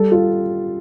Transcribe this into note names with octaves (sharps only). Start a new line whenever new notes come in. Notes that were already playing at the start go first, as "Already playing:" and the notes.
Already playing: G3 A4
F4